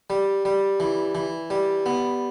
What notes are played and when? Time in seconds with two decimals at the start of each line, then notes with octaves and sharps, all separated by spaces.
0.10 G3
0.45 G3
0.80 E3
1.15 E3
1.50 G3
1.86 B3